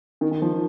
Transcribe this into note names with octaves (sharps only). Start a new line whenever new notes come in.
D#3
D#3
F3
D#3